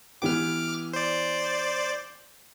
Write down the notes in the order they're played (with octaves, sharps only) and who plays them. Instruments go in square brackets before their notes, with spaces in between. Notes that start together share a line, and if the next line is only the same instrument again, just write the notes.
[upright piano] E3 B3 G4 [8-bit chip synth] D6 F6
[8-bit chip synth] C5 D5